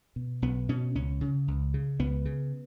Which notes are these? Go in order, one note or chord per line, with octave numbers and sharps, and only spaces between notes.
B2
B1 B3
B2 C#4
C#2 C#4
C#3
C#2
C#3
C#2 B3
C#3